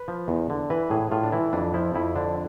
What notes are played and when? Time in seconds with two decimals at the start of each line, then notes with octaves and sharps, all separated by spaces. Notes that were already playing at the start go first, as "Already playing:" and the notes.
Already playing: B4
0.08 F3
0.28 E2
0.50 D3
0.70 E3 B4
0.90 A2 G#4
1.11 A2 F4
1.24 D4
1.32 E3 E4
1.53 F2 D4
1.74 F3 E4
1.95 F2 E4
2.16 D3 D4